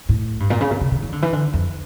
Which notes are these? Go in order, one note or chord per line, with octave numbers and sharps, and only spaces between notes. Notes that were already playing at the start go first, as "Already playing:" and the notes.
A2
G2
A#2
C#3
A#2
C#3
D3
E3
D3
E3
D3
F2